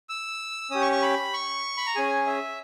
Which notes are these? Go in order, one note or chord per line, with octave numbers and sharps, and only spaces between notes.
E6
C#4 G4 D#6
C#6
C#6
B5
C#6
B5
A#5
C#4 G#4 G#5
E5